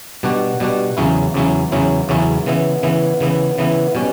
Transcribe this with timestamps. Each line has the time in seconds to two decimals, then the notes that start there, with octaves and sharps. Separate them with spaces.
0.23 B2 G3 D4 F#4
0.60 B2 G3 D4 F#4
0.97 E2 C#3 F#3 C#4 E4
1.34 E2 C#3 F#3 C#4 E4
1.72 E2 C#3 F#3 C#4 E4
2.09 E2 C#3 F#3 C#4 E4
2.46 C#3 E3 B3 E4
2.83 C#3 E3 B3 E4
3.21 C#3 E3 B3 E4
3.58 C#3 E3 B3 E4
3.95 B2 G3 C#4